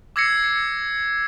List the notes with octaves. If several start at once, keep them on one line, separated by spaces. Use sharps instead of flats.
D6 E6 G#6 A#6 C7 C#7